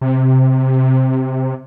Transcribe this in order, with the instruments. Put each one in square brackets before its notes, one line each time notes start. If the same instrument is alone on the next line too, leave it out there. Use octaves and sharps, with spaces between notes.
[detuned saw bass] C3